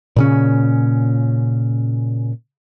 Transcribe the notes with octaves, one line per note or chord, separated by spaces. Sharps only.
A#2 C#3 C#4